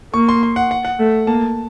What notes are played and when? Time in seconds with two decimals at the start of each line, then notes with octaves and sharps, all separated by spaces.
0.14 A#3 C#6
0.29 C6
0.43 C6
0.56 F#5
0.71 F#5
0.85 F#5
0.99 A3
1.27 A#3 A5